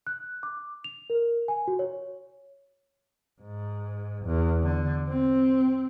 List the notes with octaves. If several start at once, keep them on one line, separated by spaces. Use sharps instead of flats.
F#6
D6
F7
A#4
G#5
F#4
C#5
G#2
E2
D3
C4